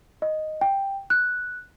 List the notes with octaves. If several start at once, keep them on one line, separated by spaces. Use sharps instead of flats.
D#5
G5
F#6